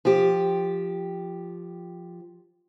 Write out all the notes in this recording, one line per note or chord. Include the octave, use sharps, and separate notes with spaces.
F3 G4